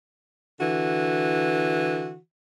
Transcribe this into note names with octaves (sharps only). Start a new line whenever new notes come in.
D3 E3 F#4